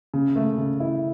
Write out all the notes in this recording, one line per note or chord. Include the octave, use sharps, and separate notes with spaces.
C#3
A3
C#3
E4